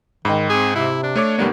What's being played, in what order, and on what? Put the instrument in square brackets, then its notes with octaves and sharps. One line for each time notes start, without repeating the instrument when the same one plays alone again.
[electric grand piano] G#2 [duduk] D#3 [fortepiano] D#5 G5 B5
[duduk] C4 [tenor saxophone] G#4
[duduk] C3 [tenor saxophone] E4
[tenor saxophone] D4
[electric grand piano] A3 C#5 D6
[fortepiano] B1 G3 A#3 [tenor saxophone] D3 [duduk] B3